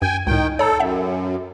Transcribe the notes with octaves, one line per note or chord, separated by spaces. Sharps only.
F#2 G5 G#5
C#2 A2 D#3 G5
A4 C#5 A#5
F#2 E5 F#5